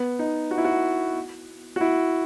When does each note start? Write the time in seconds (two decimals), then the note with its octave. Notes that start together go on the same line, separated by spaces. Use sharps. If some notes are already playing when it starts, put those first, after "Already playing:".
Already playing: B3
0.19 D#4
0.51 F#4
0.58 E4
0.65 F#4
1.76 F#4
1.81 E4